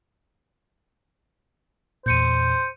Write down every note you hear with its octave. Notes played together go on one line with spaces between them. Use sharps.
E2 A#2 C5 G6 C#7 D#7